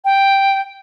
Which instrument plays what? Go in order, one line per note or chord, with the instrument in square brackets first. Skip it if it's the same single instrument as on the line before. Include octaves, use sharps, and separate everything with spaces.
[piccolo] G5